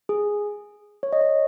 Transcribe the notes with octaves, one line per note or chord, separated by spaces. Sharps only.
G#4
C#5
D#5
C#5